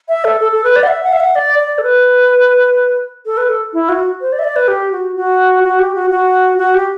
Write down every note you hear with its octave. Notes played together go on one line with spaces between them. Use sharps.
E5
A4
A4
A4
B4
D5
F#5
E5
F#5
E5
F#5
D5
D5
A4
B4
A4
B4
A4
E4
F#4
C5
D5
E5
D5
B4
G4
F#4
F#4
F#4
G4
F#4
F#4
F#4
G4